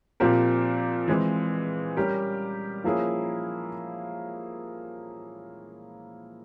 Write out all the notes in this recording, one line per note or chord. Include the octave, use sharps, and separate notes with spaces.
A#2 F3 C4 G4 A#4
E3 G#3 C4
G3 C#4 G4 A#4
F3 A#3 C#4 E4 G#4